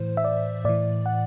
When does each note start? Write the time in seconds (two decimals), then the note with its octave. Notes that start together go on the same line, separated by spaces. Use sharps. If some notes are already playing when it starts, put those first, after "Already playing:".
Already playing: A2 E3 C5
0.17 E5
0.24 D5
0.65 A2 E3 D5
1.06 F#5